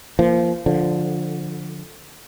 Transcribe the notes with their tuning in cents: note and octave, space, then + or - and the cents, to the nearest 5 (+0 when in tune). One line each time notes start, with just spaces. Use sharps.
F3 -25 A#3 +0
D3 +0 F3 +15